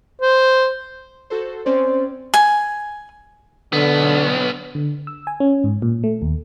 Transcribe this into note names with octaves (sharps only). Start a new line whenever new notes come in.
C5
F#4 A4 C5
C4 C#4 C5 D5
G#5
B1 D3 B3
D3
E6
G#5
C#4
G#2
A#2
A3
D#2